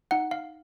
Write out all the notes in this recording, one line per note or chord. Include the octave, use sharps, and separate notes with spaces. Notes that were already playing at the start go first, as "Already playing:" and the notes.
D#4 F#5
F5